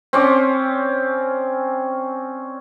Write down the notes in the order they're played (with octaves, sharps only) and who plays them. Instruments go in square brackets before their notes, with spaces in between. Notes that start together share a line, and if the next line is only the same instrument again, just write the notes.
[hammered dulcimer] C4 C#4 D5